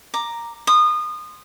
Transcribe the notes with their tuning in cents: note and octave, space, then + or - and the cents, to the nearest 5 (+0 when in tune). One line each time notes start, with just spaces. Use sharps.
A#5 +0 D6 +10
C6 +0 D#6 -25